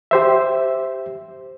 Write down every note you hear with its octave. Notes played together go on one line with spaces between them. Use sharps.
G4 C5 E5